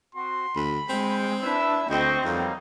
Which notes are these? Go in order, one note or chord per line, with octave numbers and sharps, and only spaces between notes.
C4 F#4 C6
D2 B5
G#3 C4 G5
D4 E4 B4 E5 E6
D2 C4 C5 D#5 G5 C#6
F2 F#3 G3 A#3 D#4